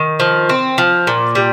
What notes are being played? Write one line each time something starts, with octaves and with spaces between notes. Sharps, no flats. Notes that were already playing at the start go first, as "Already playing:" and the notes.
Already playing: D#3
F3
C4
F3
A#2
G3